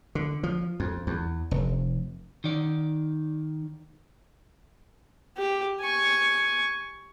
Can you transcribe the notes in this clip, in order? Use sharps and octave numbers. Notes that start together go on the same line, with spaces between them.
D3
F3
F2
E2
F1
D#3 D5
G4
G#5 C#6